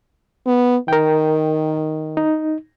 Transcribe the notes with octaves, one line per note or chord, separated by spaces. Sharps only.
B3
D#3 A#4 G5
D#4